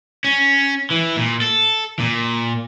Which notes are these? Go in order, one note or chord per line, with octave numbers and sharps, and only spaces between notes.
C#4
E3
A#2
A4
A#2